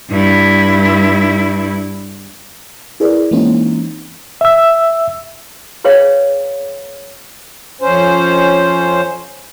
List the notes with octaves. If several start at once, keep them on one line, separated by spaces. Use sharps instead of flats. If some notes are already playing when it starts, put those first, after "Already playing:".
G2 E4
E4 G#4 A#4 B4 D5
E3 G#3 A#3 C4 C#4 D#4
E5 E6
G#4 B4 C#5 F5 G5
F2 C#4 C5